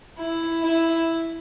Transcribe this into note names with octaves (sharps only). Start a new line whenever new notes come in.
E4
E4